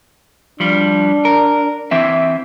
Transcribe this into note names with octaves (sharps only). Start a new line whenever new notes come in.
F3 G3 D4
A#4
E3 C4 E5